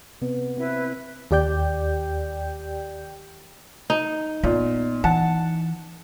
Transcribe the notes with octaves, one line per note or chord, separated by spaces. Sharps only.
C3 B3
C4 E4 B4
D#2 G4 D5 G5 G6
D#4
A#2 B3
E3 F#5 A5